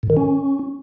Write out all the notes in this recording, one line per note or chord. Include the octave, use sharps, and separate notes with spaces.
A2
D#3
C#4